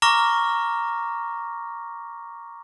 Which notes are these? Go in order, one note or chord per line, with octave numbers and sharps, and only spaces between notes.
A#5 C#6 D6 F6 A#6